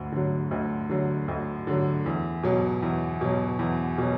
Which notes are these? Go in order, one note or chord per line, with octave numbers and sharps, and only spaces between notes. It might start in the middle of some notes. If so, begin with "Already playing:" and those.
Already playing: D2 D3
D3 F#3
D2
D3 F#3
D2
D3 F#3
E2
B2 F#3
E2
B2 F#3
E2
B2 F#3